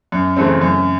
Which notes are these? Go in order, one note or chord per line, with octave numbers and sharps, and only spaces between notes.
F#2
C#3 E3 A3 C4
F#2